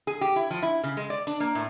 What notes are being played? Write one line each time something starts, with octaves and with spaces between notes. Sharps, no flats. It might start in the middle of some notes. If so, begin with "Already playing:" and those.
G#4
G4
E4
F3
E4
C#3
G#3
D5
D4
A#3
A2